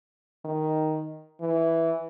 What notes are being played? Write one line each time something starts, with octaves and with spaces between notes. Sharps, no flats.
D#3
E3